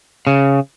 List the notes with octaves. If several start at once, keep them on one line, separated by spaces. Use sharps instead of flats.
C#3